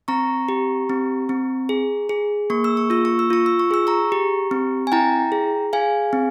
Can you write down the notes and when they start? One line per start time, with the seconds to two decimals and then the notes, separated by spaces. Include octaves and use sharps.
0.08 C4 A#5 C#6
0.49 G4
0.90 C4
1.29 C4
1.69 G#4
2.09 G#4
2.50 A#3 C#6
2.64 E6
2.77 C#6
2.90 F4 E6
3.05 C#6
3.19 E6
3.30 F4 C#6
3.46 E6
3.59 C#6
3.71 G#4 E6
3.87 A#5 C#6
4.12 G4
4.51 C4
4.87 G#5
4.92 E4 G5 A#5
5.32 G#4
5.73 G#4 F5 G#5
6.13 C4